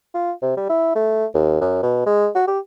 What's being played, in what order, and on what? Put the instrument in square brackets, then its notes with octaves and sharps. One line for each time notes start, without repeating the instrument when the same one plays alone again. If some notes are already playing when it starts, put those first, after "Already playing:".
[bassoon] F4
C3
G3
E4
A3
D#2
F#2
B2
G#3
F#4
G4